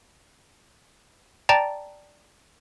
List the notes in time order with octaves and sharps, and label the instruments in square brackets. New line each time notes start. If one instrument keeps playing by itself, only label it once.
[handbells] D5 G5 A5 A#5 A6